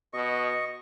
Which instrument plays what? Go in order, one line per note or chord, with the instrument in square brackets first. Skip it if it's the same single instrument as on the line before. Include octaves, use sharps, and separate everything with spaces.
[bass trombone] B2 [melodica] D#5 C#6